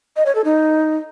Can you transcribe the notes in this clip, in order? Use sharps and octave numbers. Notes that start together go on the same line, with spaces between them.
D#5
C#5
A4
D#4